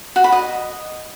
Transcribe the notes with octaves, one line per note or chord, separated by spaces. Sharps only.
F#4
B5
D#5